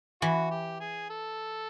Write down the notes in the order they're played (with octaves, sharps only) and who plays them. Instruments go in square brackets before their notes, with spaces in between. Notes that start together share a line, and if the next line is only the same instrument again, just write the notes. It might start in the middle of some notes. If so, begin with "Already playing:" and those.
[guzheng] E3 [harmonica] F#4
[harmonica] G4
G#4
A4